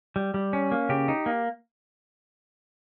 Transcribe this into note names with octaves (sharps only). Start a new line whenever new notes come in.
G3
G3
C#4
A#3
C#3 G4
D#4
A#3